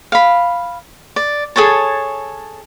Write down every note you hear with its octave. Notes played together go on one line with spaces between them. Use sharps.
F5 B5
D5
G#4 A4 C#5 A5